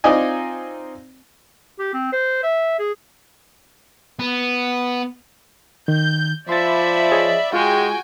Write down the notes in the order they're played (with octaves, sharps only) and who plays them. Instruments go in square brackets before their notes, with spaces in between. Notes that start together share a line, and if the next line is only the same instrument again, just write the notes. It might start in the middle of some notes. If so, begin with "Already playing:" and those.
[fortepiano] C4 D#4 F4 D5 D#5 G#5
[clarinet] G4
C4
C5
E5
G#4
[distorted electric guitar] B3
[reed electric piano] D#3 [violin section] G6
[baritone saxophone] F3 [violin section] D5 E5 B5 [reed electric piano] C6 A6
[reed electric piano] G#4 C#5 D#5
[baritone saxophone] G#3 [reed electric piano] F4 G#4 [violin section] F#4 G5 G#5